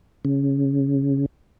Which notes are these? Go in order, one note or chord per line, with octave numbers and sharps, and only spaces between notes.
C#3